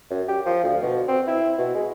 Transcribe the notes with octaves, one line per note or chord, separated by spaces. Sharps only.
F#2
G4
F3
D2
B2
C4
E4
B2
G#3